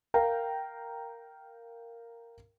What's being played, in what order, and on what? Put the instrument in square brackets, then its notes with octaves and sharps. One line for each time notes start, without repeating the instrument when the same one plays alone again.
[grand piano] A#4 F5 G5 A#5